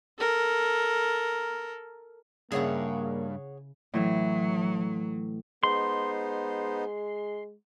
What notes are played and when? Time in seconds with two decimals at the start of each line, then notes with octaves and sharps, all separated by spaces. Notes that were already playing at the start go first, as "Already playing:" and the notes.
0.19 A4 A#4
2.52 G2 C#3 A#3 E4 G#4 C#5 F#5
3.94 A2 E3 F#3 E5
5.63 G#3 B3 D#4 C5 C6